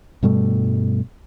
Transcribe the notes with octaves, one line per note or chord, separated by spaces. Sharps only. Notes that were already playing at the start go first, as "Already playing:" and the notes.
G2 B2 G3 A3